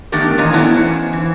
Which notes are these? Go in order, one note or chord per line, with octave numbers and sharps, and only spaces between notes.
D#3 A3 B3 D4 G4 A#4
A#2 E3 C#5 D#5 A#5
F#3 A3 B3 C#4 D4 E4
E2 C#4 C5
E3